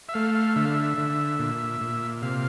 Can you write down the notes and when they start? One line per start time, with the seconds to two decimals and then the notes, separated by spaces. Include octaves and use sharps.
0.09 E5
0.14 A3 F5
0.35 F5
0.56 D3 E5
0.65 F5
0.74 E5
0.98 D3
1.39 A#2
1.81 A#2
2.22 C3 F5